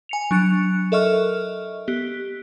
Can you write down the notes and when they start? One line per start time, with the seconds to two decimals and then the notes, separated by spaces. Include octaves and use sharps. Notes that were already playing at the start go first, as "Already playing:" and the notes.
0.09 G#5 C#7 F7
0.31 F#3 D4 F#6 C#7
0.92 A4 A#4 D#5 E5 C#6 F6
1.88 B3 G4